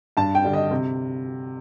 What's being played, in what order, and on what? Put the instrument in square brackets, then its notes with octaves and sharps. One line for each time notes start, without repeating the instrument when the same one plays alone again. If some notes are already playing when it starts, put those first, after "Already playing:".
[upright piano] G2 A5
G5
D3 G3
D#5
C3